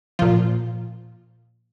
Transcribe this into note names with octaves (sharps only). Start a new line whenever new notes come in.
A#2 F3 F4